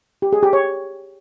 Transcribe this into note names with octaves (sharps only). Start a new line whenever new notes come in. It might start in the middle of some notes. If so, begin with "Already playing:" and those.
G4
G#4
G4
C#5